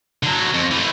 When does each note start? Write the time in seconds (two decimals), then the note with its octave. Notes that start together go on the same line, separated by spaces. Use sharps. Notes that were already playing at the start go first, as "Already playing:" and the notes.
0.23 D3 F#3
0.54 F2
0.71 E3 A3